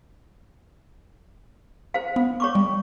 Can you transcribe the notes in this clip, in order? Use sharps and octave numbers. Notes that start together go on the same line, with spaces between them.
C5 F5
B3
C#5 C#6 D6
G3